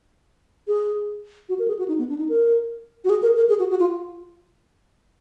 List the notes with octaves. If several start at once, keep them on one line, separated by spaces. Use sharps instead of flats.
G#4
F#4
A#4
G#4
F#4
D#4
B3
D4
D#4
A#4
F#4
G#4
A#4
A#4
G#4
F#4
F#4
F4